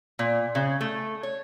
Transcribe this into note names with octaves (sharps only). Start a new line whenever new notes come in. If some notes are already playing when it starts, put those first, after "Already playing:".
A#2
C#3
A3
C#5